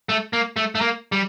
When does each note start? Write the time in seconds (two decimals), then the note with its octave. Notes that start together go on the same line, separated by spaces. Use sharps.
0.09 A3
0.33 A#3
0.56 A3
0.75 A3
0.81 A#3
1.12 G3